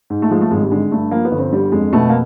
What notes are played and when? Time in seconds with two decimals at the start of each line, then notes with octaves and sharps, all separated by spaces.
0.10 G#2
0.22 A3
0.30 F3 G#3
0.41 A3
0.51 G#1 G#3
0.61 G3
0.71 D3 G#3
0.92 G2 A3
1.11 F3 A#3
1.25 B3
1.31 G1
1.39 C4
1.52 D3 G3
1.72 F2 G#3
1.93 B2 A3
2.09 A#3